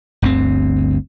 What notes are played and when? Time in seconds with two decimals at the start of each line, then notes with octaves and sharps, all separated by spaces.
0.22 G1 D2 G2 C4